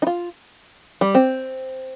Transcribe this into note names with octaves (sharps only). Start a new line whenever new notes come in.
D#4
F4
G3
C4